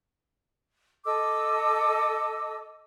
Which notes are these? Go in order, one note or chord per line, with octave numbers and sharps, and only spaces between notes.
A4 D#5 D6 E6